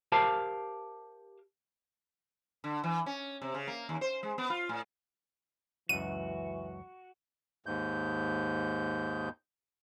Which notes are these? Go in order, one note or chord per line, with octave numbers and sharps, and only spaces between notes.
G4 A#4 C5 F5 A5
D3
E3
C#4
C3
C#3
A#3
D#2
C5
G#3
B3
F4
A2
C#2 F#2 E3 F#4 D#7
D#2 G#2 G6